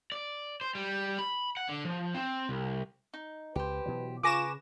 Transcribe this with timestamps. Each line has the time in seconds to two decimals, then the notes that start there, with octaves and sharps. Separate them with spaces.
0.12 D5
0.61 C5
0.75 G3
1.19 B5
1.57 F#5
1.69 D3
1.85 F3
2.15 C4
2.49 C2
3.14 D#4
3.56 C#2 G4 B4 C5
3.86 B2 E3 F#3
4.23 C#3 F4 B4 G#5 C#6 D6 A#6 E7